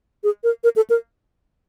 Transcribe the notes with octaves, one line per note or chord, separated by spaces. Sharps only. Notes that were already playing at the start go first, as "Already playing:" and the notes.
G#4
A#4
A#4
A4
A#4